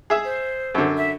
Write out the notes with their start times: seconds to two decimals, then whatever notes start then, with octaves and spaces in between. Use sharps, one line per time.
0.10 G#4 E5
0.25 C5
0.74 F#2 D3
0.97 E5